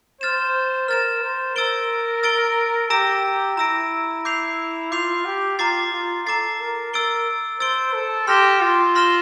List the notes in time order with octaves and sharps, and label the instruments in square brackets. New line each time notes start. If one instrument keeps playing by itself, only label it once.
[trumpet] C5 [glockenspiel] F6 A6 E7
[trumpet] A#4 [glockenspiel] F6 A6 E7
[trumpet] C5
[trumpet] A#4 [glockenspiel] E6 A6 D7 G7
[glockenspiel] E6 A6 D7 G7
[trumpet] G4 [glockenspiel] A#5 E6 A#6 D7
[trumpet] E4 [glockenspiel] A#5 E6 A#6 D7
[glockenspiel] D6 G6 C7 F7
[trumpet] F4 [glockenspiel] D6 G6 C7 F7
[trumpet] G4
[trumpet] F4 [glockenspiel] A#5 D6 A6 C7
[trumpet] F4
[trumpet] A4 [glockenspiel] A#5 D6 A6 C7
[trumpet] A#4
[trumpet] A#4 [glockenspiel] E6 A6 D7 G7
[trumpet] C5 [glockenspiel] E6 A6 D7 G7
[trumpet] A4
[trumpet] G4 [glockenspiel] C6 F6 A#6 E7 G7
[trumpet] F4
[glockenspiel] C6 F6 A#6 E7 G7